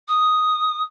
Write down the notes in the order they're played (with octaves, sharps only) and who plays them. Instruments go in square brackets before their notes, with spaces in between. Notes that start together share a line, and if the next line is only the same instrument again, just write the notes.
[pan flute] D#6